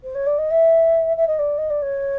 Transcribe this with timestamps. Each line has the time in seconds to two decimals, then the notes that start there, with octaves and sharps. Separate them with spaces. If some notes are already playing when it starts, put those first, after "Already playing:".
0.03 C5
0.15 C#5
0.26 D5
0.38 D#5
0.50 E5
1.17 E5
1.27 D#5
1.38 D5
1.58 D#5
1.70 D5
1.82 C#5